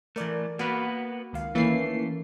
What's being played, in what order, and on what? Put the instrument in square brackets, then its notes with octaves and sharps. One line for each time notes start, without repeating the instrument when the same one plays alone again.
[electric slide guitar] E3 A3 [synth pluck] A#4 D5
[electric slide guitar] A#3 B3 B4 [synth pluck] F#4
[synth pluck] C#2 D#3 F5
[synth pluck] D#3 A#3 C#4 [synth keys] E3 C7 [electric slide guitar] A3